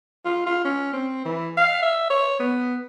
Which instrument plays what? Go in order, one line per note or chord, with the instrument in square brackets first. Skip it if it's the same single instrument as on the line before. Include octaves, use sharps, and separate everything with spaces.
[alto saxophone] F4
F4
C#4
C4
E3
F5
E5
C#5
B3